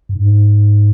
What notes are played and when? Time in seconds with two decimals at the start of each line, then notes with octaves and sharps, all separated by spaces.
0.09 G2
0.16 G#2